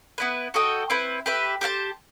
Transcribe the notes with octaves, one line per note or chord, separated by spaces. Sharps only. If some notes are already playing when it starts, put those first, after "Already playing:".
B3 E4 B4
F#4 A4 D#5 G5
C4 E4 B4
G4 B4 E5
G4 C5 F#5 A5